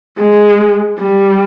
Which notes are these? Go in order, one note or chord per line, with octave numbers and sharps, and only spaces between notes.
G#3
G3